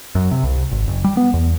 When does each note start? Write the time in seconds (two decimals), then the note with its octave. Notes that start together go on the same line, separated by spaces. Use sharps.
0.15 F#2
0.31 C3
0.43 C2
0.71 G#1
0.88 F#1
1.04 G3
1.17 B3
1.34 E2